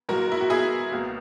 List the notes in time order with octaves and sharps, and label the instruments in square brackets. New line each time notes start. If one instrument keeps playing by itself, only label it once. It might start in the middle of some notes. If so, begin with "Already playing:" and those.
[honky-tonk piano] G#2 F#3 A#3 F#4 A#4
E4
F#4
E4 G#4
C#2 B2 A#3